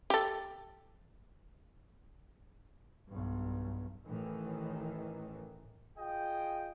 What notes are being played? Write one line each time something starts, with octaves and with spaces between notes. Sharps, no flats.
G4 A4
B1 G2
A1 A2 D#3 E3
F4 G#4 D#5 G5